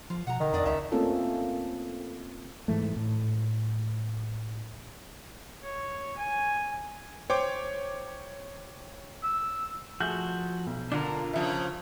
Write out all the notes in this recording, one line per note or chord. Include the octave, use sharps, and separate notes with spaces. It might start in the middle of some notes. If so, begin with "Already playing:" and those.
F3 F4
B2 F#5 A#5
D3 D#3
F2 D4 D5 D#5
C#2 C#3 C#4 E5
A3 A#3 C4 C#4 F4 A4
G#2 E3 A3
A2
C#5
G#5
C5 C#5 G5 D6
E6
F3 A3 F#4 G#4 G6
B1
D3 D4 F4 A#4
C#3 F3 E5